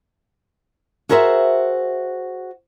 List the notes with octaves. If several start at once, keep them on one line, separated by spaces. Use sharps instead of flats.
F#4 G#4 A#4 C5 D#5 E5